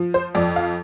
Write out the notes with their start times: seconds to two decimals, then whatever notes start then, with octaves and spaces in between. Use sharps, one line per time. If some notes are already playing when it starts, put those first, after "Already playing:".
Already playing: F3
0.14 C5
0.35 F2 D5
0.56 F5